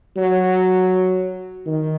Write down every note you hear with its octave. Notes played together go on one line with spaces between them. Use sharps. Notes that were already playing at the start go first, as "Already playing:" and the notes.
F#3
D#3